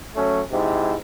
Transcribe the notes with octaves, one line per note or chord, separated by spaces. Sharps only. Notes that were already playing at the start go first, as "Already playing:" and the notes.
F#3 A3 C#4
G#2 C3 E4